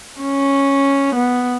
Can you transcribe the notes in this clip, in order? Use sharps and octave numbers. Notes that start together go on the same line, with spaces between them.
C#4
B3